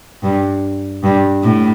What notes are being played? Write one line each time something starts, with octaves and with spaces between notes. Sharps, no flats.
G2
G2
A2